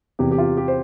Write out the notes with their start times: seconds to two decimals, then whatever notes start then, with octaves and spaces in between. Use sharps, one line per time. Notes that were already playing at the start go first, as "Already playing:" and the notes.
0.19 E2 C3 E3 G4
0.31 G4
0.38 F4
0.57 G4
0.68 C5